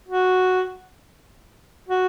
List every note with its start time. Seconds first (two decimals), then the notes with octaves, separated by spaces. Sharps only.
0.09 F#4
1.89 F#4